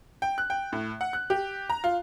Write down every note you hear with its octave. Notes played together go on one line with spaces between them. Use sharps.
G5
F#6
G5
A2
F#5
F#6
G4
A#5
F4